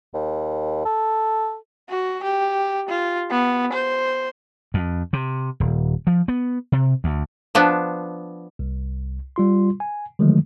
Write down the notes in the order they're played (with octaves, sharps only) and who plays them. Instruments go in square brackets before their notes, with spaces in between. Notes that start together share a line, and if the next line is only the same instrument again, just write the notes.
[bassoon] D#2
A4
[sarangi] F#4
G4
F4
B3
C5
[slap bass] F2
C3
D#1
F3
B3
C3
D2
[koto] F3 B3 D4
[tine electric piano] C2
G3 F4 C6
G#5
D3 D#3 F3 F#3 G#3 A3